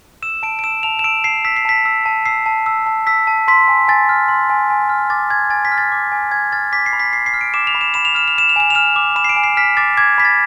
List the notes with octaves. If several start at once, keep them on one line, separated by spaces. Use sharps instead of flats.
E6 E7
A5 D7
D7
E6 E7
A5 F7
E7
E6 D7
A5 C7
E6 B6
C7
A5 B6
E6
A5
E6 C7
A5
E6
A5
E6 B6
A5
C6 B6
G#5
G#5 A6
F6
C6
G#5
G#5
F6
D6 A6
G#5 G#6
G#5 A6
B6
F6
A6
D6
G#5
G#5 G#6
F6 A6
D6 B6
C7
B5
B6
B5 C7
C7
F6
D7
D6 E7
F7
B5
E7
B5 E7
F7
F6 E7
F7
B5 E7
F7
G#5 E7
F7
F6 E7
D6
B5 E7
C7
D7
G#5
C7
F6 B6
D6 A6
D6 G#6
B5 B6
A6